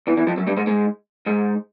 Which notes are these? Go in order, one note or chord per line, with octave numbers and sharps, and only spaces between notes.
E2 E3
E2 E3
F2 F3
F#2 F#3
G2 G3
G#2 G#3
G#2 G#3
G#2 G#3